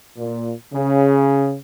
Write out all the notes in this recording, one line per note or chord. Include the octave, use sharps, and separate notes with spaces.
A#2
C#3